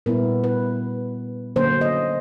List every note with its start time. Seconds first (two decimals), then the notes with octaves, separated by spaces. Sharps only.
0.06 A#2 G3 B3 E4 A#4
0.44 B4
1.56 D3 F#3 A#3 C#4 C5
1.81 D#5